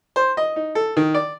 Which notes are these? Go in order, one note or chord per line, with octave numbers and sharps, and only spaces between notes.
C5
D#5
D#4
A4
D#3
D5